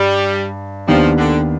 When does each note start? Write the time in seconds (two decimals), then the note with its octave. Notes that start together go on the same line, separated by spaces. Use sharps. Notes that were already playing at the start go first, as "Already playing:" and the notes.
Already playing: G2 G3
0.88 D#2 D#3 F3 B3 D4 G4
1.18 D3